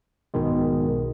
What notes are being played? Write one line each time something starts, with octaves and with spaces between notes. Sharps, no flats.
B1 G#2 B2 D#3 G#3